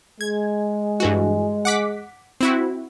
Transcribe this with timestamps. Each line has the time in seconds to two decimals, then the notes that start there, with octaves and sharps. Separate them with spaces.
0.21 G#3 G#6
1.00 G2 E3 F#4
1.65 F#5 D6 B6
2.41 C4 E4 F#4